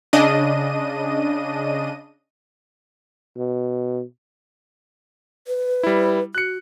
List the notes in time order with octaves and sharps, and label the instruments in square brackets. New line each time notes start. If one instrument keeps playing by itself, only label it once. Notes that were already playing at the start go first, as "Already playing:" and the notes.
[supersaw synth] C#3 D4 D#5 D#7
[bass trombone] B2
[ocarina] B4
[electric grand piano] G3 E4
[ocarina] F#4 [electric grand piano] F#6 C#7